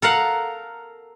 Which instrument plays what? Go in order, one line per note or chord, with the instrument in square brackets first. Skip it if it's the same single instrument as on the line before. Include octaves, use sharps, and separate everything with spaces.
[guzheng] A4 A#4 F5 F#5